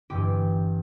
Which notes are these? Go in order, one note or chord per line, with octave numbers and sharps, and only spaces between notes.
G1 G2 E3 G4